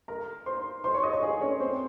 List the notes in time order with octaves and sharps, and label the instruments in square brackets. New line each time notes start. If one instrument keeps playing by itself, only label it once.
[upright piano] A#4 A#5
C5 C6
C5 C6
C#5 C#6
D#5 D#6
C#5 C#6
G#4 G#5
C#4 C#5
C4 C5